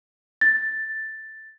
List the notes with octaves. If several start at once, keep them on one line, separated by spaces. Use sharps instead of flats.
A6